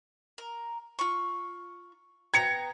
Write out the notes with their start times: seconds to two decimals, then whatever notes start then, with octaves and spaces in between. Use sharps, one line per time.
0.38 A#4
0.99 F4 C#6
2.34 B3 G5 A#5 G#6 C#7